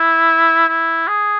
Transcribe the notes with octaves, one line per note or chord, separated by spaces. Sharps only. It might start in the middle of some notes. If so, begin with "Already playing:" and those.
Already playing: E4
E4
G#4